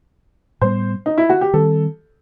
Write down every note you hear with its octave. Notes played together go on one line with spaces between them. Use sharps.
A2 G3 B3 C5
D#4
E4
F#4
G4
D#3 G3 C4 A4